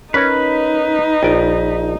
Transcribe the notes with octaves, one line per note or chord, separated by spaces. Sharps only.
C#4 D#4 A#4 B4 C#5
A#1 D5 G5